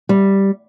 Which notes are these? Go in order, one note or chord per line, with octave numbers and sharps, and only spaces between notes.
G3